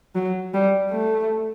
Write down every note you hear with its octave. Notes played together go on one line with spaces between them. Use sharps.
F#3
G3
A3